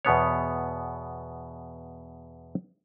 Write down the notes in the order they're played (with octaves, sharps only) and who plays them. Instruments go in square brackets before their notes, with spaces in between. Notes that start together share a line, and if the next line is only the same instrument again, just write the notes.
[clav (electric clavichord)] E2 B2 B3 C#5